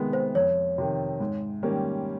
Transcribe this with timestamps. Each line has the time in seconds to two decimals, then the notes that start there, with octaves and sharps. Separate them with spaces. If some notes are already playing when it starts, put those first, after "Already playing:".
Already playing: C3 D#3 G#3 B3
0.13 C5
0.35 F2 C#5
0.78 C3 D#3
1.20 G#2
1.63 D#3 G3 A#3 C#4